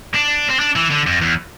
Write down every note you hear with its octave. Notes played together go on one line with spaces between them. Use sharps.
D4
C4
D4
E3
D3
F2
E2